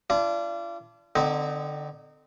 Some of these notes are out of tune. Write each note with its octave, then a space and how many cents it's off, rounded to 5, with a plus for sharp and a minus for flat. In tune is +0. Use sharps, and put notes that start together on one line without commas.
D4 -15 F4 -40
D3 +5 C4 -35 D#4 -25